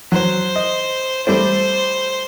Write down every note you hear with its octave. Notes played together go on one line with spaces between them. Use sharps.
F#3 C5
D#5
G3 A3 C4 C5